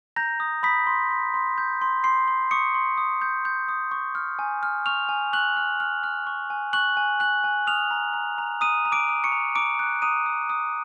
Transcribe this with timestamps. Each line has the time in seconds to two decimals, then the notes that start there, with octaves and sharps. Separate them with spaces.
0.16 A#5 G6 A#6
0.40 D#6
0.63 B5 D#6 B6
0.87 C6
1.11 C6
1.34 C6
1.58 G6
1.81 C6
2.04 C6 C7
2.28 C6
2.51 C#6 D#6 C#7
2.75 C6
2.98 D#6
3.22 G6
3.45 G6
3.68 D#6
3.91 C#6
4.15 F6
4.39 G#5
4.63 F6
4.86 C#6 F6 F7
5.09 G#5
5.33 C#6 F#6 F#7
5.56 F6
5.80 F6
6.03 F6
6.27 C#6
6.50 G#5
6.73 C#6 F#6 F#7
6.97 G#5
7.20 G#5 F#6 F#7
7.44 G#5
7.67 D#6 F6 F7
7.91 A#5
8.14 A#5
8.38 A#5
8.61 A#5 D#6 D#7
8.85 A#5
8.92 D6 D7
9.09 D#6
9.24 C#6 C#7
9.32 A#5
9.55 A#5 D6 D7
9.79 F#6
10.02 A#5 D#6 D#7
10.26 D#6
10.50 D#6